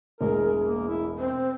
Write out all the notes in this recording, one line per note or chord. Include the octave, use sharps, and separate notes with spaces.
E1 A1 G#4 A#4
A#3
E4
C4 C5